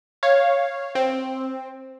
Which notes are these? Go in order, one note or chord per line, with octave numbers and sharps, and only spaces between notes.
C#5 F5
C4